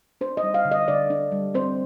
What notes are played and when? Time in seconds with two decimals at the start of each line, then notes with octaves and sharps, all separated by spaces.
0.21 D4 C5
0.37 D#5
0.43 G3
0.54 F5
0.65 D3
0.72 D#5
0.88 D3 D5
1.10 D4
1.32 G3
1.54 C4 C5